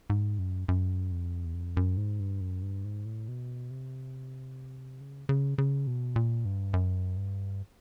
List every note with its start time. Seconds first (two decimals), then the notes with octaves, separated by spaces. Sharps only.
0.10 G#2
0.39 F#2
0.68 F#2
1.12 F2
1.45 E2
1.54 F2
1.77 F#2
1.97 G#2
2.20 G2
2.41 F#2
2.62 G2
2.85 G#2
3.05 A2
3.28 B2
3.71 C3
5.01 C#3
5.29 C#3
5.58 C#3
5.87 B2
6.16 A#2
6.45 G2
6.74 F#2
7.17 G2